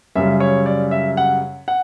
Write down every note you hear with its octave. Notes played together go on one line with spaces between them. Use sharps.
F#2 C#3 G3 E5
C#5
D5
E5
F#5
F#5